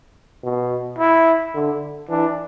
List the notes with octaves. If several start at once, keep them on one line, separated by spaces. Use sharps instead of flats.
B2
E4
D3
E3 D4